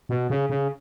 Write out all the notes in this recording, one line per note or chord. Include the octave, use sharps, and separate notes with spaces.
B2
C#3
C#3